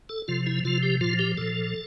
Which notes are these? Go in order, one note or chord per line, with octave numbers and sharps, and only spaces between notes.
A4
C3 F3 F4
E4
C3 F3 F4
G4
A#2 F3 F4
G4
A#2 F3 A4